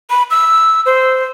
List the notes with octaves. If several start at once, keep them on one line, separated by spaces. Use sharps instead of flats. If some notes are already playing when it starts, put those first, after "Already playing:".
B5
E6
C5